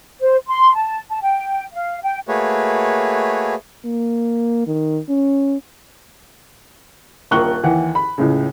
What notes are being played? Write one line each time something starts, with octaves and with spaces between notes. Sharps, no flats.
C5
C6
A5
A5
G5
F5
G5
A3 A#3 F#4 G#4 B4 C#5
A#3
D#3
C#4
D#1 A#1 A#4 C#6 F#6 G7
D#2 E3 F#5
B5
C#2 A2 C#3